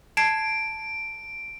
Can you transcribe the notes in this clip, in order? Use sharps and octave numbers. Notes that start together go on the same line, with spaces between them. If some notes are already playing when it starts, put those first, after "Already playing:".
A5 G#6 C7 D7